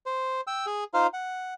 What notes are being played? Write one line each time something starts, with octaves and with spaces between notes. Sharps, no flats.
C5
G5 E6
G#4
D#4 F4 C5 F5
F#5